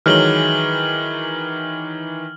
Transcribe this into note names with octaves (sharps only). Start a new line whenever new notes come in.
D#3 E3 F#3 G#3 F6 F#7 G7